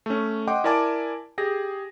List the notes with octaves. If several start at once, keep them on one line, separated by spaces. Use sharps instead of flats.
A3 C#4
D#5 F#5 G5 C6 D6
E4 A#4 D5 G#5 A5 D6
G4 G#4 A#6